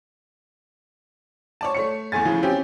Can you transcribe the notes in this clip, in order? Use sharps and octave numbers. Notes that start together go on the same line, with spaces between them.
C#5 D5 A5
A3 C#5 C#7
E2 A2 A3 G#5 A6
A2 C#3 E3 F3
C4 C#4 G4